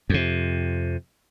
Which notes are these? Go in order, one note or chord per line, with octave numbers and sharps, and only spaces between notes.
F2 C3